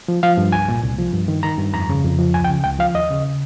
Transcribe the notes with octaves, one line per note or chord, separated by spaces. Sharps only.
F3
F3 F5
G2
C2 G#5
A#2
C2
F3
G2
D#3
D#3 A#5
G2
F2 A#5
C#3
F2
F3
C#2 G#5
G5
C#3
C#2 G5
F3 F5
D#2 D#5
C#3